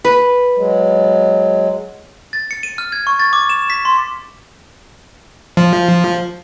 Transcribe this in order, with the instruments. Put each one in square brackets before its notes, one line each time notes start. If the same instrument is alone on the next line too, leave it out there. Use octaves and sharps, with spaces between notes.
[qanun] B4
[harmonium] F#3 G#3
[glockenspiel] A6
C#7
D#7
F6
G#6
C#6
A6
D6
E7
B6
C6
[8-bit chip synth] F3